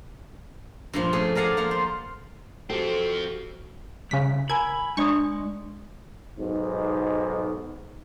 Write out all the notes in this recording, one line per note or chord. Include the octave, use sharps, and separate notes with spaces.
G2 A#2 F3
A3 C#4 G#4
A#4 D5 F5 F#5 G#5 A5
F3 A#3 F5 F#5
C5
F3 C4 F#4 G4 A4
C2 C#3 B6
A#4 G#5 B5 G#6
G#3 D4 D5 C#6 D#6
B1 G#2